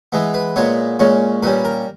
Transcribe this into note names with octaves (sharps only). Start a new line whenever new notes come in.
E3 G#3 B3
B4
A#2 G#3 B3 C#5
A#2 G#3 C#4 C#5
A#2 G3 C#4 B4
A#4